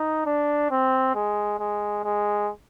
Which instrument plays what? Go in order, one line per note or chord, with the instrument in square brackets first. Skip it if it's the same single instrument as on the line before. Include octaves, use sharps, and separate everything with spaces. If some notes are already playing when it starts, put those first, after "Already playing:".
Already playing: [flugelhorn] D#4
D4
C4
G#3
G#3
G#3